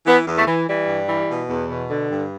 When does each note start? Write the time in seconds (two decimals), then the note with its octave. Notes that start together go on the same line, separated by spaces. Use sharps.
0.06 E3 B3
0.27 E2
0.37 A3
0.47 E3
0.68 E3 G3
0.87 G2
1.09 E3
1.29 B2
1.49 E2
1.70 B2
1.90 D3
2.11 G2